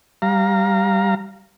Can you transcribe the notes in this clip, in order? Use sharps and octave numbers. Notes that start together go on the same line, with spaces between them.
G3 F5 A#5